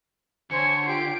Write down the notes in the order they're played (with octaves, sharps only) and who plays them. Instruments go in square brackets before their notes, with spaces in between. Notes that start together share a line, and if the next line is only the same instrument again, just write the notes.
[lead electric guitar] D3 [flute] C5 [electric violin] C#5 G#5 [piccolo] C#7
[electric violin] F4 D7 [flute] G4 [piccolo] C7